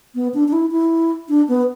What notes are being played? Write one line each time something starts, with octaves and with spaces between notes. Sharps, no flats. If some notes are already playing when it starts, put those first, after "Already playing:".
B3
D4
D4
E4
E4
D4
B3